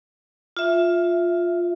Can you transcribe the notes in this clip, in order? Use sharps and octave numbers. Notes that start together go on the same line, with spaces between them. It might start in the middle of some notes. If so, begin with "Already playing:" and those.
F4 E5